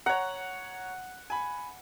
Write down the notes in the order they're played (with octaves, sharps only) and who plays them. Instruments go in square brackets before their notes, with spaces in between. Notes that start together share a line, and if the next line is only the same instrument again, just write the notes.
[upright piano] C#5 A#5 [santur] F#5
[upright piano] G#5 B5